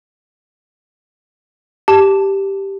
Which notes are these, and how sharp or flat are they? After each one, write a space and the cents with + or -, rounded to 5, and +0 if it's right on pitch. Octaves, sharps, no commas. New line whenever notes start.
G4 +0 A5 +0